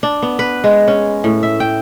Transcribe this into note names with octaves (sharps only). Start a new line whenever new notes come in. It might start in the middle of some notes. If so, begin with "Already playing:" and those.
D4
B3
B4
G#3
C#4
A2
E5
G5